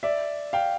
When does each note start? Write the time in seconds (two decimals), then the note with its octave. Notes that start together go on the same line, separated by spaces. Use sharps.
0.03 D5 E5
0.53 F5 G5